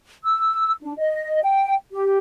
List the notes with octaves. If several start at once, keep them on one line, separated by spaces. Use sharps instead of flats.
E6
D4
D#5
G5
G4